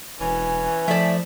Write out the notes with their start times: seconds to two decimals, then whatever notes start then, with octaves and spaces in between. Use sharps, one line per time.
0.21 E1 E3 C#4
0.88 F3 A3 E4 A4 D5 E5